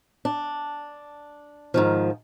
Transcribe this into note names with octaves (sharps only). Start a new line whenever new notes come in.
D4
G#2 D#3 F3